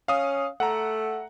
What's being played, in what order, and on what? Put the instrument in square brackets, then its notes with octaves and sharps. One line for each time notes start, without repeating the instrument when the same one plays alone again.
[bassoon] C#4 [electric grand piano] F5 D#6
[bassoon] A3 [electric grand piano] F#5 A#5